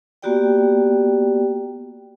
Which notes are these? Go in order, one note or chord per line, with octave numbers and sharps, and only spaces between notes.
A#3 B3 F#4 G4 D5 G5